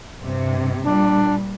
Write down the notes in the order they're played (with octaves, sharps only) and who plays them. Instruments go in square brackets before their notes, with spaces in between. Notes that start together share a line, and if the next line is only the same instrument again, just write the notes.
[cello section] G2 C3
[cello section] A#2 G3 [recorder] D4